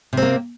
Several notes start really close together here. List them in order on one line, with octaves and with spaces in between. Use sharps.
C3 C4 A#3